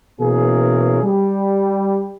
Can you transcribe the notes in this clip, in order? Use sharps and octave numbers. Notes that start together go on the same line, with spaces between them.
B2 E3 A#3 C#4 G#4
G3